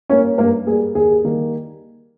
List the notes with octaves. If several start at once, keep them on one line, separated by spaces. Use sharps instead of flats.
G3 A#3 C#4 C#5
G2 A#3 A#4
G3 A#3 G#4
D#2 G#4
D#3 G3 A#3